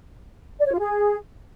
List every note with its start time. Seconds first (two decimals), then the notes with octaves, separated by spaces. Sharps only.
0.59 D5
0.66 C#5
0.73 F4
0.79 G#4